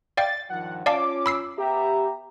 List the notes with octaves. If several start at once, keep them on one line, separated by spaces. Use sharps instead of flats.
D5 F5 G5 A6
G2 D#3 F3 F#5
C#4 F4 D5 F5 A5 D6
B5 E6 C7
B3 G4 E5 A#5